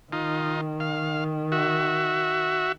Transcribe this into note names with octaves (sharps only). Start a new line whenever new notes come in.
D#3 D#4 F4
F5
F#4 E5